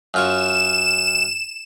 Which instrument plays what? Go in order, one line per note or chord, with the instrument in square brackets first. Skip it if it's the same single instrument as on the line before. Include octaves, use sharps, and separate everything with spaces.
[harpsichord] F#2 F4 C#5 [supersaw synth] E7